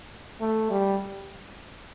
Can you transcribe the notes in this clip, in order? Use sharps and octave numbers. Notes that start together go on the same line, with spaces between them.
A3
G3